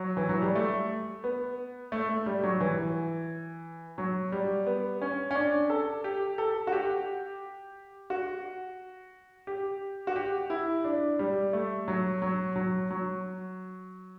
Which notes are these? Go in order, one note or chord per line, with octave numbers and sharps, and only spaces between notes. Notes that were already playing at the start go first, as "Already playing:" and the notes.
Already playing: F#3
E3
F#3
G3
A3
B3
A3
A3
G3
F#3
E3
F#3
G3
B3
C#4
C#4
D4
A4
G4
A4
F#4
G4
F#4
G4
F#4
G4
E4
D4
G3
A3
F#3
F#3
F#3
F#3